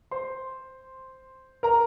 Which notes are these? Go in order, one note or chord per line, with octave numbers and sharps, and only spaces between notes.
C5 C6
A#4 A#5